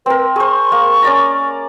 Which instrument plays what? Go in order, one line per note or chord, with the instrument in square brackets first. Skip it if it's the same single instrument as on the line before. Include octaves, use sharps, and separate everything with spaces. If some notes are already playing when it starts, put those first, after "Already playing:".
[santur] C4 A#4 [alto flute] B4
[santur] G#4 C5 [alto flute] C#6
[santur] A#3
C#4 D5 A#5